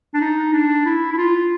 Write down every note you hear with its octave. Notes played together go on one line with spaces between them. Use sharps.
D4
D#4
D4
E4
E4
F4